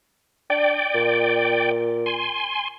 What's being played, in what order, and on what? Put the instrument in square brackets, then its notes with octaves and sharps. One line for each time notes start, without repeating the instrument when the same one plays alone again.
[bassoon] D4 [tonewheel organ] D5 G5
[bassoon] A#2
[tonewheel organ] G#5 C6